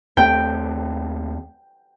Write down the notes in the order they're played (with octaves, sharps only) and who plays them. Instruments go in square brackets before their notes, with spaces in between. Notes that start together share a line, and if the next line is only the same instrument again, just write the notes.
[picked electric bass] D#2 A3 C4 [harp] G5